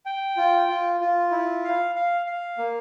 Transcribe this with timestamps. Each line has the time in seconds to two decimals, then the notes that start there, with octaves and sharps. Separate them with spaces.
0.06 G5
0.37 F4
0.68 F4
1.00 F4
1.31 E4
1.64 F5
1.95 F5
2.26 F5
2.58 A#3